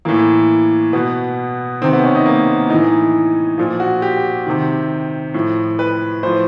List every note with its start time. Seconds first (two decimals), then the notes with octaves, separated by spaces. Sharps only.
0.05 A2 E3 A#3
0.93 B2 B3
1.81 C3 D#3 C4
1.93 B3
2.04 C#4
2.15 D#4
2.26 A#3
2.69 A2 E3 D#4
3.58 A#2 F3
3.80 F#4
4.02 G4
4.46 C3 D#3
5.34 A2 F3
5.79 B4
6.23 A2 F3 C5